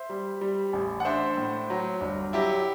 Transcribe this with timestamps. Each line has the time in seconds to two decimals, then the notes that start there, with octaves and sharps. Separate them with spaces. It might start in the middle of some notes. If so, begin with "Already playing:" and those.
Already playing: C5 E5
0.10 G3
0.41 G3
0.73 A1
1.00 F#5
1.05 D4 C5 E5
1.37 A2
1.70 F#3
2.01 G1
2.33 F#3 E4 G4